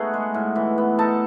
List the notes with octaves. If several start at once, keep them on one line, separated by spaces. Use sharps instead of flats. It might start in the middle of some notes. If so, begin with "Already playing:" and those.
Already playing: A3 B3 D#4 F#4 G#4 F#5
G#3
A2
E3
B3
D#4 A4 A5